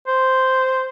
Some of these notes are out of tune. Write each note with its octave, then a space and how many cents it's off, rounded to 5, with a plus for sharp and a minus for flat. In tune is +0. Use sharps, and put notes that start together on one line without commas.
C5 -5